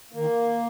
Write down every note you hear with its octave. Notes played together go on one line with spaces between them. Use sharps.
D#3 A#3